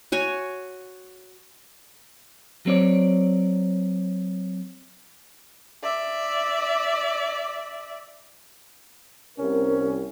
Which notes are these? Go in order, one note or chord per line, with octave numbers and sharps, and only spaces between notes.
F#4 C#5 G#5
F#3 C4 C#5 D5
D5 E5
C2 C#4 A#4